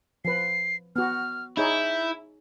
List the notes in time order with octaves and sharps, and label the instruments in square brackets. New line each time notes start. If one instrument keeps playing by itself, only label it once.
[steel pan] F3 B4 [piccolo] C7
[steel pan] B3 F#4 [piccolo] F6
[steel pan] D#4 G#4 C#5 [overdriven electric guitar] E4 [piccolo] G6